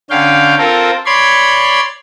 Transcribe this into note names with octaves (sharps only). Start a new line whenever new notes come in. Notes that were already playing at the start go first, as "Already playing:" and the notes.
D3 C#4 F5 G5
C4 F4 A4 A#4
C#5 D5 B5 C6 G#6